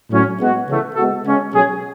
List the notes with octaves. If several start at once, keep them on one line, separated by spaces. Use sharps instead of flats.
A2 F#3 C#4
G#3 B3 F#4
C#3 E3 A3
G#3 B3 F#4 A4
C#3 G#3 C#4
B2 F#3 C#4 G#4